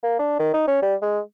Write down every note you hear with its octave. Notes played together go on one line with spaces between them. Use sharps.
A#3
D4
D#3
D#4
C#4
G3
G#3